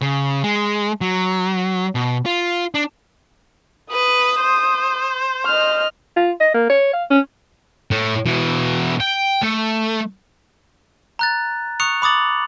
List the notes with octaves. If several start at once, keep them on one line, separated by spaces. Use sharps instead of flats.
C#3
G#3
F#3
B2
F4
D4
B4 D#6
C5
D#5 F6
F4
D#5
A#3
C#5
F5
C#4
A2
B2 E3
G5
A3
A#5 F#6 A6
C#6 D#6 F#6 C#7 F7
B5 D6 D#6 A6 F#7